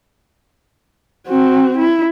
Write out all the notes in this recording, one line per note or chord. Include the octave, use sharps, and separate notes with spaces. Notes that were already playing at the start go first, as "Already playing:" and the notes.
C4 F#4
E4